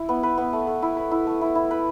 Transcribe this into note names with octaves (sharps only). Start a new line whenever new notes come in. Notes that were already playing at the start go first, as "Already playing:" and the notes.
Already playing: E4
B3
B4
B3
A3
A3
E4
B4
E4
A3
E4
E4
B4